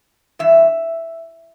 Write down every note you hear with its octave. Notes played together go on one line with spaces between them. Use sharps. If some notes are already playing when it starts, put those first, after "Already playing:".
G2 E3 E5